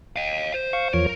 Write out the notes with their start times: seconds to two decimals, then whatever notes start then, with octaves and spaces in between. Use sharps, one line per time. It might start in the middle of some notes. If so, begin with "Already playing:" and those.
0.16 D#5 F5
0.54 C5
0.73 F5 C#6
0.94 E2 F3 A#4 C#5